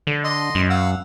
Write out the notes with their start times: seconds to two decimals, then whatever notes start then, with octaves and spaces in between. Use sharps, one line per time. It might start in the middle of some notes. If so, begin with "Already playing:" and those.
0.07 D3
0.24 D#5 C6
0.55 F#2
0.70 F5 F#5 E6